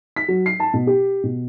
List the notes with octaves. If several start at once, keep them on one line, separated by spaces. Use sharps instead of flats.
B6
F#3
C7
A5
B2
G4
B2